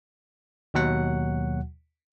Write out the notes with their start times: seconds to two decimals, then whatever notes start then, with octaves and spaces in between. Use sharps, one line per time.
0.74 D#2 B2 F#3 F#4 F#5